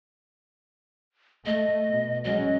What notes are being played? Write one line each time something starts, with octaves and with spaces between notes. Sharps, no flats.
A3 D#5
B2
F#3 G#3 C#4 D#5